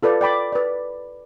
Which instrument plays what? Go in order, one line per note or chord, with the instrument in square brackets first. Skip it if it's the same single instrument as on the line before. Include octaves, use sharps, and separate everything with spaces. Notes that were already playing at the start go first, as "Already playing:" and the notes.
[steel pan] F4 A4 B4 D5
D5 G5 B5 D6
B4 D5